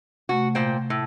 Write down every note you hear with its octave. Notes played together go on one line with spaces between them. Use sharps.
C3 A3 F#4
A#2 C5 G5
A2